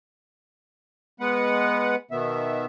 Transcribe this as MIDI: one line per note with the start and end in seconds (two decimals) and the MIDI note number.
1.20 1.96 56
1.20 1.96 59
1.20 1.96 71
1.20 1.96 78
2.11 2.66 47
2.11 2.66 51
2.11 2.66 59
2.11 2.66 76